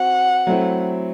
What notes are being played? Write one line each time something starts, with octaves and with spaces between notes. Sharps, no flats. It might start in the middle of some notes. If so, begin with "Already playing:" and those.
Already playing: C4 F#4 F#5
F#3 A3 C4 E4